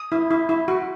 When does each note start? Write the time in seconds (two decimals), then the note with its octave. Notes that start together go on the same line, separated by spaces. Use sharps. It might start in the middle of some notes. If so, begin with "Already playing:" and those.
Already playing: D#6
0.12 E4
0.31 E4
0.49 E4
0.68 F#4